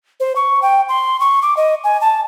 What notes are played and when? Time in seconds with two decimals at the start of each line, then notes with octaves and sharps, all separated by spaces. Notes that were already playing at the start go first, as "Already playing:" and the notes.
0.20 C5
0.36 C#6
0.62 G5
0.89 C6
1.20 C#6
1.42 D6
1.57 D#5
1.84 G#5
2.01 A5